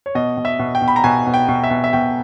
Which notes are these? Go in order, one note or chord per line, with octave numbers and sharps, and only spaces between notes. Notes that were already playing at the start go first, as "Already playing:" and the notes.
C#5
B2 D#5
B2
E5
B2
G5
B2
B5
A#5
B2 G#5
B2
G5
B2
E5
B2
E5
B2 G5